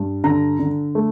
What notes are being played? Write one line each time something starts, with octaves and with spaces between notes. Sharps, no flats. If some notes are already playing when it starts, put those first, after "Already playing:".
Already playing: G2
D3 A#5
D3
A3